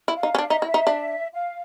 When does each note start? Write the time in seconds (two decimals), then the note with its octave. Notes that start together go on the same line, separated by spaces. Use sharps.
0.08 E4
0.16 F5
0.23 D#4
0.35 C#4
0.38 D4 F5
0.48 D#4 E5
0.57 D#5
0.62 E4
0.67 E5
0.74 D#4
0.87 D4
1.33 F5